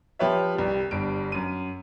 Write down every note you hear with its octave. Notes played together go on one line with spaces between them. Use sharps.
F3 G4 B4 C#5 E5
C2 G3
G1 G2 D7
F#2 D#7